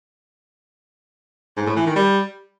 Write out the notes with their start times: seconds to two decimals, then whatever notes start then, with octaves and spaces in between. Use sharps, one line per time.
1.57 G#2
1.66 A2
1.76 E3
1.86 D#3
1.96 G3